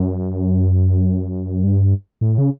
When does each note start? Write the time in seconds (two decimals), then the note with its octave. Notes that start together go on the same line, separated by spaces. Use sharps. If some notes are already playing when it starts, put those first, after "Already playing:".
Already playing: F#2
1.64 G2
2.21 A2
2.38 C#3